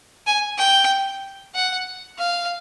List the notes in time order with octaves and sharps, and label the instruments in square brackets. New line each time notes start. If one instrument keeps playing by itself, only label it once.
[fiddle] G#5
G5
F#5
F5